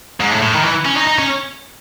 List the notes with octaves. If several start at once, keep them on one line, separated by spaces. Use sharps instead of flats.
G#2
A2
A2
D#3
E3
C#4
D#4
D#4
C#4